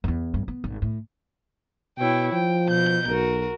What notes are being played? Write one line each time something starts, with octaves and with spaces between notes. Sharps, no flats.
E2 E4
G2
B3
G#1
A2
B2 E4 C#5 G5
F3 G5
B2 G6
B1 F#4 A#4